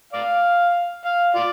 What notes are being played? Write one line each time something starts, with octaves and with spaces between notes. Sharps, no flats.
D5 F5
F5
F4 D5